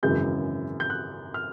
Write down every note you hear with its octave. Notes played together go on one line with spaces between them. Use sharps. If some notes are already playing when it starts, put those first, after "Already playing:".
G#1 F#2 C#3 E3 G#3 G6
G6
F#6
F6